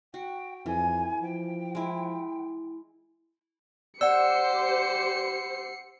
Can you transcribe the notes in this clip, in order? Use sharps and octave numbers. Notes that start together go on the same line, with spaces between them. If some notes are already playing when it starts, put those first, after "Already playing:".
F#4 G5
F2 E3 G#5
F3 G5
G#3 E4
G4 C5 D5 F#5 E6 C7 C#7